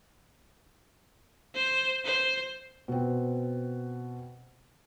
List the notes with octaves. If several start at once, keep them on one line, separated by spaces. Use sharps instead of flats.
C5
C5
B2 C4